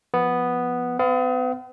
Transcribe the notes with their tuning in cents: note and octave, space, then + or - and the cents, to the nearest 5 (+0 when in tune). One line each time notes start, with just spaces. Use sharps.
F3 +0 B3 +0
B3 +45 F5 +0